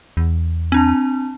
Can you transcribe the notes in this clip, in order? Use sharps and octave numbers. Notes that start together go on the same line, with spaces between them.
E2
C4 D4 A5